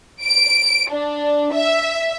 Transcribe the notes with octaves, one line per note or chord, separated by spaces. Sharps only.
D7
D4
E5